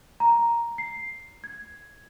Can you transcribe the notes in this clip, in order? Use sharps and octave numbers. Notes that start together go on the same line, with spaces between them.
A#5
C7
G#6